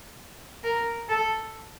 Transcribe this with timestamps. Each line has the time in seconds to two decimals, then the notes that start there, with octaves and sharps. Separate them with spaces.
0.64 A#4
1.09 A4